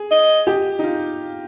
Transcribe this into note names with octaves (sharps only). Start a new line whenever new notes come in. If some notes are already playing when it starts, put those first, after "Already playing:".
Already playing: G#4
D#5
G4
D#4
F4